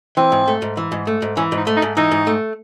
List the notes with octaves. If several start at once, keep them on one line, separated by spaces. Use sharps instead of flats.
E3 C4
G#2
A3
G#2
E3
G#2
A3
G#2
E3 C#4
G#2 D#4
A3
D#4
G#2
E3 D#4
G#2
A3